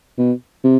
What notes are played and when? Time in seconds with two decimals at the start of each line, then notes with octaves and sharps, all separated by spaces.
0.18 B2
0.64 C3